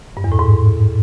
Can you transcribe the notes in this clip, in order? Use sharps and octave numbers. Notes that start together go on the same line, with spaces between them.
G2
E2
A2
G#2